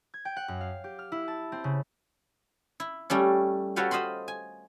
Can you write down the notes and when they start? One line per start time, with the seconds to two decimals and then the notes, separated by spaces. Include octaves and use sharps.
0.14 G#6
0.25 G5
0.36 F#5
0.48 F#2
0.61 F5
0.84 G4
0.99 F6
1.12 E4
1.28 A5
1.52 C4
1.64 C#3
2.80 E4
3.10 G3 A3 C#4
3.76 F#4 A4 B4 C#5 F5 G5
3.91 C5 D#5 F5 B5 C6
4.28 G#5